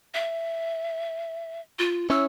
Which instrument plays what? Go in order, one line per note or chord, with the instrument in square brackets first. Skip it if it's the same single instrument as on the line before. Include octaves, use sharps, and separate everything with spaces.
[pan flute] E5
F4
[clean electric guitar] C#4 E4 C#5 [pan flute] E6